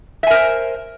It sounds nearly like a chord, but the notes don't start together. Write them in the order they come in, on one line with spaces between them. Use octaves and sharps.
E5 G#5 A#4 C5